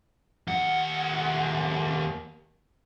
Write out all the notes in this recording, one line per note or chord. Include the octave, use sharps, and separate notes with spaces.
D#2 F#5